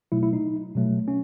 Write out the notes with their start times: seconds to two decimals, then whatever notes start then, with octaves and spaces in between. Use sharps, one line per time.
0.12 B2 F#3 A3 E4
0.23 E4
0.33 D#4
0.75 B2 F#3 A3
1.08 C#4